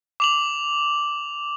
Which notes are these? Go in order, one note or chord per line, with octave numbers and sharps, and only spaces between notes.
D6 F7 F#7